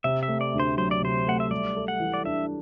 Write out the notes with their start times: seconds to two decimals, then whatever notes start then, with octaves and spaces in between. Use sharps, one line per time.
0.04 C3 E5
0.23 E5
0.28 A3
0.41 D5
0.54 D2
0.60 C5
0.78 F#3 C5
0.91 D5
1.02 C3 C5
1.27 A3 F#5
1.40 E5
1.51 G3 D5
1.76 A4
1.88 F#5
2.00 E3
2.14 D5
2.25 D4 E5